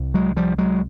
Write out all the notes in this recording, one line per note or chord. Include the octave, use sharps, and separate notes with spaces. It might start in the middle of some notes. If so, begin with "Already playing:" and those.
Already playing: C2
F#3 G#3
F3 G3
F#3 G#3